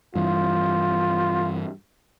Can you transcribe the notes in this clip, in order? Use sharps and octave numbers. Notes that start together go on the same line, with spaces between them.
G2 E3 F4